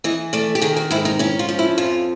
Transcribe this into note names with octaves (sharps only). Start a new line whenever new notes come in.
E3 D#5
A3 D5
G4
D#3 G#4
F#4
G#2 E4
D#4
C#4 E4
F4
F3
E4
F2 F4